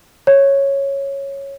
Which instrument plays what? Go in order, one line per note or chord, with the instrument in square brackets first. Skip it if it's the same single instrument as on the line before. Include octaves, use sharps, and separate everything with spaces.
[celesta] C#5